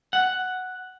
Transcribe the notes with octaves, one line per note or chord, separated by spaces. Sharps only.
F#5